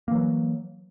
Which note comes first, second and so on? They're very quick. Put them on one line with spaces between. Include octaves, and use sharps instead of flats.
A#3 E3 F#3